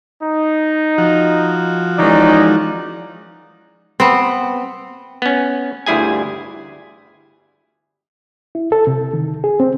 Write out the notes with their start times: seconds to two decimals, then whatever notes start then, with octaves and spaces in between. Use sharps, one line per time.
0.23 D#4
0.98 F3 F#4
1.99 D#3 E3 G#3 C#4 D#4 D5
4.00 B3 C4
5.22 B3 C#4
5.86 G1 D2 G3 E4 G#4 G#5
8.55 E4
8.72 A4
8.87 C3
9.13 D#3
9.44 G#4
9.60 C4